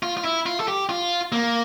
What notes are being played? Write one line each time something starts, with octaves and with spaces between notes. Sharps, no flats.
F4
F4
E4
F4
A4
G4
F4
A#3